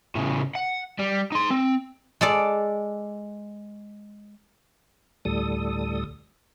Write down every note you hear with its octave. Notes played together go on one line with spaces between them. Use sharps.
A2 C#3
F#5
G3
D#4 C6
C4
G#3 A4 D5
D2 A2 G3 A4 D#6